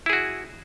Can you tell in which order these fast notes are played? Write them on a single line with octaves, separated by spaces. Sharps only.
E4 G#4 F#4